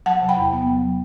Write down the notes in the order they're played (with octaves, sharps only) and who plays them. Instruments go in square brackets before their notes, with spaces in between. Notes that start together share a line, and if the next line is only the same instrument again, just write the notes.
[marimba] F#3 F#5 A5
C3
G5 B5
E2
B3
F#3